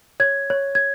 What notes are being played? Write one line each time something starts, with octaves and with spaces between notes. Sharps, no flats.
C#5 G#6
C#5
G#6